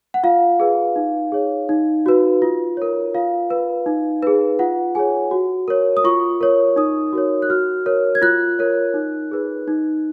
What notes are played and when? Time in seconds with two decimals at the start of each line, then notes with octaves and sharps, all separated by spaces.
0.14 F#5
0.23 F4 F5
0.60 G#4 B4
0.96 D#4
1.32 G#4 C#5
1.69 D#4
2.06 F#4 B4
2.42 F4
2.77 A#4 C#5
3.14 F4 F5
3.51 B4
3.86 D#4
4.23 G#4 B4
4.59 F4 F#5
4.95 G#4 C#5 G#5
5.31 F#4
5.68 A#4 C#5
5.97 D#6
6.04 F4 C#6
6.41 A#4 C#5
6.76 D#4 D#6
7.13 F#4 A#4 C#5
7.42 F#6
7.49 F#4 F6
7.86 A#4 C#5
8.15 G#6
8.22 F4 F#6
8.59 A#4 C#5
8.94 D#4
9.31 G#4 B4
9.68 D#4